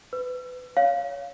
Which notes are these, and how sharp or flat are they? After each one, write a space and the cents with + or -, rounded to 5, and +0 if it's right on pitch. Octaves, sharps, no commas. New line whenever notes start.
B4 +25 E6 +40
C#5 +25 F5 +0